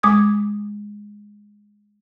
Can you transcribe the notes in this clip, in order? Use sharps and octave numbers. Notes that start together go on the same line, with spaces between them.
G#3 D6 D#6 G#6